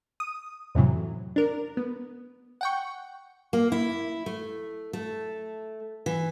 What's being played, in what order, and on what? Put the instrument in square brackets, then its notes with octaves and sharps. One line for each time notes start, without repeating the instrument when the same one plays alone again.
[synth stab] D#6
F2 A2 C3 E3 F#3
D4 A#4
B3
F#5 G5 C#6
[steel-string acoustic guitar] A#3
E4
A3
A3
E3